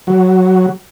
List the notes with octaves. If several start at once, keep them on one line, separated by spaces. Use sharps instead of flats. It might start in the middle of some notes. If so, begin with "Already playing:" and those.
F#3